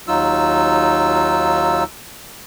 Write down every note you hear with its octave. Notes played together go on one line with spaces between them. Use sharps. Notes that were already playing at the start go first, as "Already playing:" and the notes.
D#2 F#3 D#4 F4 E6